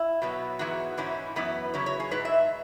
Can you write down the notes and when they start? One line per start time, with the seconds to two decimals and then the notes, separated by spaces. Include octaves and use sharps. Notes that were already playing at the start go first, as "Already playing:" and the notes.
Already playing: E4
0.22 B2 F#3 B3
0.59 G#2 E3 B3 E4 F#4
0.97 G#2 E3 C#4 E4
1.36 F#2 E3 B3 E4 B4
1.74 C#3 F#3 E4 C#5
1.86 C#5
2.00 G#4
2.11 G#2 G#3 E4 B4
2.25 E5